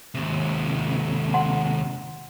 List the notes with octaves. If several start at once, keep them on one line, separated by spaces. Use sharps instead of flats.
D#2 C3
F#5 C6